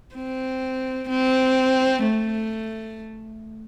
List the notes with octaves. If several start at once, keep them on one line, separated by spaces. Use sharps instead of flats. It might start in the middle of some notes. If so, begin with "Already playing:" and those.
C4
C4
A3